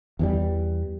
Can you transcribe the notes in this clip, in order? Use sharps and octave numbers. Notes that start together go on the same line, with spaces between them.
E2 E3 G3